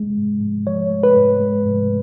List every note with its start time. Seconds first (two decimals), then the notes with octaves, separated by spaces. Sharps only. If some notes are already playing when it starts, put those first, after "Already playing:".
Already playing: G#3
0.17 G#2
0.41 G#2
0.67 F3 C#5
0.91 G#3
1.03 B4
1.16 G#2
1.40 G#3
1.65 G#2